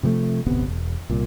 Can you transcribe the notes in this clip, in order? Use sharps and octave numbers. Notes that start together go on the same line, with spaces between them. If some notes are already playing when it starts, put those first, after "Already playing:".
C3 F3 G3 A3
D1 G1 C3 B3
E1
C2 A#2